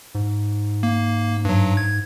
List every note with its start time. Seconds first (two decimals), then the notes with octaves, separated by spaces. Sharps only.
0.15 G#2
0.83 A#3
1.45 G2 F#3
1.77 G#6